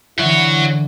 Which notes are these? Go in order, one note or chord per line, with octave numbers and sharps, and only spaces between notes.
D3 E3 E4 C#5 F#5